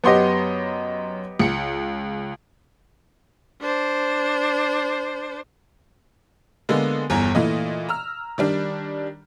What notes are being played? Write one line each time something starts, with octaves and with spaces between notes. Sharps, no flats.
F#2 B3 G4 C#5 D#5 C6
C#2 C#7
D4 C5
D3 G#3 A#3 B3
G1 E2 G#5 A#5
A#2 E3 A3 D#5
A#5 E6 F6
D#3 G3 D4